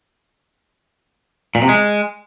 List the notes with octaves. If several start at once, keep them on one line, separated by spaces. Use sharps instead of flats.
A#2
C3
G#3